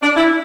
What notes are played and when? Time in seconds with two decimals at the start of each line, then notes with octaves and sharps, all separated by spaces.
0.02 D4
0.17 E4